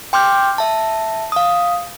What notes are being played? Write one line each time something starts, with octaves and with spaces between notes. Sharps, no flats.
G5 C6 D6 F6 G6
E5 A5
F5 D#6